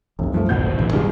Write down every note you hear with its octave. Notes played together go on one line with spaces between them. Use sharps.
F1 C2 F#2
F3 A3
D1 G#1 B2 C5 F#5 G6
A1 E3
G2 C3 D#3 G3 G#3 F4